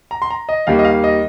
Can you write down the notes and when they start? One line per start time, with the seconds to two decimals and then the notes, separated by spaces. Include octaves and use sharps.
0.11 A#5
0.22 C6
0.30 A#5
0.49 D#5
0.67 D#2 D#3 G3 A#3 F5
0.79 D#5
0.85 F5
1.04 D#5